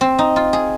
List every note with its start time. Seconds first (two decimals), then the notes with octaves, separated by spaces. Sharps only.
0.01 C4
0.19 D#4
0.36 F4
0.53 G#4